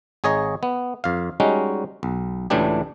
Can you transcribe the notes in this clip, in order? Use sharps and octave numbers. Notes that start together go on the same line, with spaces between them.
G#1 G#4 C#5 D#5 A#5
B3
F2 F5
G3 G#3 C#4 D#4 F#4
B1
C#2 A2 E3 A3 D4 G4